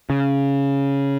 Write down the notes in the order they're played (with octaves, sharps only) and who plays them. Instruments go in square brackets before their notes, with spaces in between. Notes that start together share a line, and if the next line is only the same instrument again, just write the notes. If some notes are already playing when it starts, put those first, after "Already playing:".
[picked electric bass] C#3